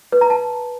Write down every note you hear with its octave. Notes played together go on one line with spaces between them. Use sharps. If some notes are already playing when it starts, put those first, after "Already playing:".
B4
A#5
A5